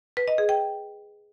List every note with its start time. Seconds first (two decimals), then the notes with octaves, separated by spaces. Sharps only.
0.17 B4
0.28 D#5
0.38 G#4
0.49 G5